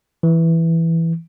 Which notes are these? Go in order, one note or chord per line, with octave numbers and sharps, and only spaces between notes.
E3